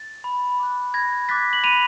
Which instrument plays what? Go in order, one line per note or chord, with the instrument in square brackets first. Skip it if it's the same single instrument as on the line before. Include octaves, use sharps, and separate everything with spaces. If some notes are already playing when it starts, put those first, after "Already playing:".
Already playing: [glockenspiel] A6
B5
D6 F#6
B5 G#6 A#6
D6 F#6 A6 B6
F#7
B5 D#7 F7